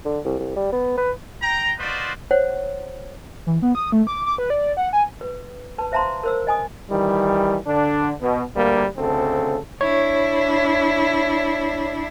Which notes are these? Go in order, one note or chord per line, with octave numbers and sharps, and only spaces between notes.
D3
C2
C2
G3
B3
B4
G5 A#5
D#4 F4 F#4 B4 C5 D5
C5 C#5 F#5
E3
B3
D#6
A3
D6
D6
B4
D5
F#5
G#5
B4
B4 A5
C5 E5 F5 A5 A#5 C6
A#4 C5 E6
D#5 G#5 D#6
D#3 E3 G3
D3 D4
B2
D2 G3 A#3
D2 C#3 C4 A4
D4 E4 C#5